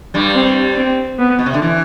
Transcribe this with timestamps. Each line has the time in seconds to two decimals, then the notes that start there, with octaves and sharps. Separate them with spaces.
0.14 G2 G3
0.36 C4
0.77 C4
1.19 B3
1.39 B2
1.46 C3
1.54 D3
1.62 E3